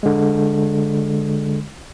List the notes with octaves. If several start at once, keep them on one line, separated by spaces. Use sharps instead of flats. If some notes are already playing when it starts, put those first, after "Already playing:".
D3 G#3